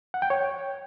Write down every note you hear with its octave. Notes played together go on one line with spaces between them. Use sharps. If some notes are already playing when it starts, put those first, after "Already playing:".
F#5
G5
C#5